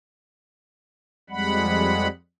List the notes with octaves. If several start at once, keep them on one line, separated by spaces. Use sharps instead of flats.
F2 G3 G#3 F#5 B5